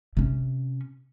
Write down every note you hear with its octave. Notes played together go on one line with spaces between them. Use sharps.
C3 C#4